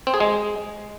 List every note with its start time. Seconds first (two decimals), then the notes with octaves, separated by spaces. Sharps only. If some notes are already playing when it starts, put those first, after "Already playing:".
0.07 C4
0.14 G#4
0.20 G#3